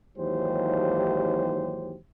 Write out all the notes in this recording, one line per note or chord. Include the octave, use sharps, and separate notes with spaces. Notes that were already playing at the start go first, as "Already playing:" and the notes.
D#2 G#2 E3 F#3 G4 C5